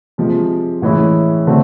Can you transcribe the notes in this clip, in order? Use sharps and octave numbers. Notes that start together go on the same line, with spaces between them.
C3 F3 G#3
A2 E3 G#3 C#4 E4
D3 F#3 A3 C4